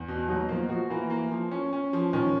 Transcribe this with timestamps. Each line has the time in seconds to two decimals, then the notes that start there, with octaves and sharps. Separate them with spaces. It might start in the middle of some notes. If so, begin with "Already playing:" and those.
Already playing: E2
0.08 B2
0.29 F#3 D#4
0.48 F3 A#3
0.69 F3 F#4
0.90 E3 A#3
1.10 A#3
1.31 F3
1.51 C#4
1.73 C#4
1.93 F3
2.13 D#3 C#4